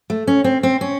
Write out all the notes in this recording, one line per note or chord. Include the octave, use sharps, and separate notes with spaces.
A3
C#4
C4
C4
C#4